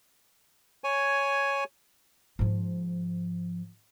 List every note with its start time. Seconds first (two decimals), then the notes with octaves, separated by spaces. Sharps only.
0.84 C#5 G#5
2.39 G#2 F3